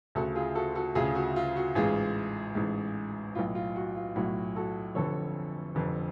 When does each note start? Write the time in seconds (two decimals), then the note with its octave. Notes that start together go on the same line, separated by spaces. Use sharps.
0.15 D2 C#3 F#4 A4
0.35 F4 G#4
0.55 F#4 A4
0.75 F#4 A4
0.95 D2 F4 G#4
1.00 C#3
1.15 F#4
1.36 F4
1.56 F#4
1.75 A1 G#2 F4 G#4
2.55 A1 G#2
3.35 B1 A2 F4
3.55 F4
3.76 F#4
3.96 F4
4.16 B1 A2 F#4
4.56 F#4 A4
4.95 F1 F2 D3 A4 C#5
5.75 F1 F2 D3